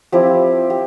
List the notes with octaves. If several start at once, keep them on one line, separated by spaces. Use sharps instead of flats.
F3 C4 E4 G4
G4